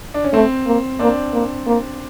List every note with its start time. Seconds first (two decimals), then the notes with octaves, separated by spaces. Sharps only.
0.14 D4
0.24 C#4
0.34 A3 C4
0.67 A#3
0.99 A#3 C4 D4
1.33 A#3
1.67 A#3